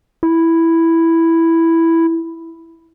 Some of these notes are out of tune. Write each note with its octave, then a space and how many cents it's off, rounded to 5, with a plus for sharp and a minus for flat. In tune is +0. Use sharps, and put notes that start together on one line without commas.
E4 +0